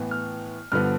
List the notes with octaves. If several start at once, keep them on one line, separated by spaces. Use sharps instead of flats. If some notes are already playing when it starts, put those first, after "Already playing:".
Already playing: A2 E3 B3
F6
G2 D3 F3 B3 F6